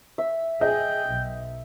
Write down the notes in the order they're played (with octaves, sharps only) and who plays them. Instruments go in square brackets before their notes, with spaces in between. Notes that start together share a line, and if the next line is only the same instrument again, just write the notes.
[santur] E5
[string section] G#4 [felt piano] D#5 [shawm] G5
[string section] B1